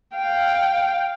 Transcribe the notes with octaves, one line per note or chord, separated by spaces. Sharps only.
F5 G5